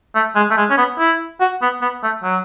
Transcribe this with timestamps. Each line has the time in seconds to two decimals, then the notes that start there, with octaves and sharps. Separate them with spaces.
0.15 A3
0.36 G#3
0.51 A3
0.57 G#3
0.70 C#4
0.77 B3
0.99 E4
1.40 F#4
1.62 B3
1.82 B3
2.03 A3
2.23 F#3